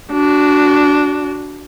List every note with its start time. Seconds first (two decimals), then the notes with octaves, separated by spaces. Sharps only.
0.12 D4 F#4